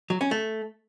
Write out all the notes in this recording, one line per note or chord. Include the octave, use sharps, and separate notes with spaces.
F#3
C#4
A3